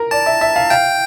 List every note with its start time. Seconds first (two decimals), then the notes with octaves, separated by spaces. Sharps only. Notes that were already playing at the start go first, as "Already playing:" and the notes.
Already playing: A#4
0.11 D5 A5
0.26 E5
0.41 E5
0.56 F5
0.70 F5 G5